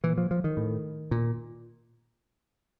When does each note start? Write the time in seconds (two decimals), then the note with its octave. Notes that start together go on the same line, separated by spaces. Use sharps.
0.04 A#2 E3
0.18 F3
0.31 F3
0.44 D#3
0.57 A2
1.11 A#2